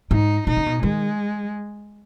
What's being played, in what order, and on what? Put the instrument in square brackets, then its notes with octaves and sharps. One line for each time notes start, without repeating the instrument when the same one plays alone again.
[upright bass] G#2 [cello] D#4
[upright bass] B2 [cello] D#4
[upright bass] C#3
B2
[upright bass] D#3 [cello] G#3